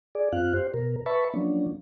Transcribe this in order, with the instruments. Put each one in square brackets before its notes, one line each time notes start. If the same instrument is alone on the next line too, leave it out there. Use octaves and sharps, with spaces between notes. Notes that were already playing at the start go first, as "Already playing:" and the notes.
[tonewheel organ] G#4 D5
F#2 C4 F4 F5 F#6
G4 C5
B2 A#4
B4 E5 A5 B5 C#6
F3 F#3 A#3 C#4 D4